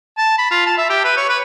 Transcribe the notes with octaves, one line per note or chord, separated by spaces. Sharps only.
A5
B5
F4
A5
E5
G4
B4
C#5
B4